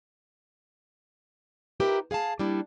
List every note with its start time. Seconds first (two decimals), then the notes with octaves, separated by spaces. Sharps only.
1.80 D#4 F4 G4 A#4 B4 E5
2.11 G#4 F5 G#5 A5
2.39 G3 A#3 D4 E4